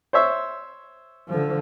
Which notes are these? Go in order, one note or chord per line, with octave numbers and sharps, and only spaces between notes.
C5 C#5 E5
D3 F3